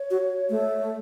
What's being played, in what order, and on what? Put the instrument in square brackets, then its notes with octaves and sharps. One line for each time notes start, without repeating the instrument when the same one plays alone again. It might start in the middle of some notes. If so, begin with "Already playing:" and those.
Already playing: [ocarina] C#5
[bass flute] F#4
A3